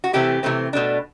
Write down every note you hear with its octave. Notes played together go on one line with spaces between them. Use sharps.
F#4
C3 E3 A3 C4 E4 G4
C3 E3 A3 C4
B2 A3 D4